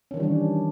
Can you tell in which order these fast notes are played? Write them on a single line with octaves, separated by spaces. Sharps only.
C#4 D#3 E3 G3 D4